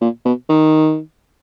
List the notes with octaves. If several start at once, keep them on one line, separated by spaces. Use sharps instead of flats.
A#2
B2
D#3